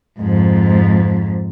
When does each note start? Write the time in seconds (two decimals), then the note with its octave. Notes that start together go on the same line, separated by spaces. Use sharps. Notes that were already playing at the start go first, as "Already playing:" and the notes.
0.19 F2 G#2